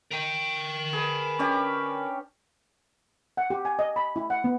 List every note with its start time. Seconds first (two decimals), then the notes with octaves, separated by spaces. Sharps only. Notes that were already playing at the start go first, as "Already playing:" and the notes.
0.11 A#4 G5
0.93 G#4 B4
1.39 C#4 D4 G4
3.37 F#5
3.50 G4
3.65 G#5
3.79 D#5
3.96 B5
4.16 E4
4.30 F#5
4.44 B3